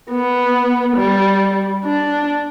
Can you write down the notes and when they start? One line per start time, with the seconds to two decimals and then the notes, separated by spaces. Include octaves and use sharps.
0.11 B3
0.96 G3
1.84 D4